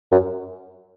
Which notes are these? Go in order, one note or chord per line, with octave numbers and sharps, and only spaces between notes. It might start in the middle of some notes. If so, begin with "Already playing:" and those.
F#2